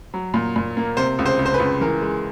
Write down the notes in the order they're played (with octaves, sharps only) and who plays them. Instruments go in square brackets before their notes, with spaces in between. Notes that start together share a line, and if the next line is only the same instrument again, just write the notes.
[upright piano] F#3
A#2
A#2
A#3
C3 C5
C#2
C5
C#2
C5
B4
C#2
E3 A#4
G#3